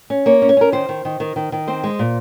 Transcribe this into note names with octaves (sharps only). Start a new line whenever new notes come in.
C#4
A#3 C#5
C#4
C#5
C#4 A#4
D#3 C5
D#3
D#3
D#3
D#3
D#3
C4 C5
G#3
A#2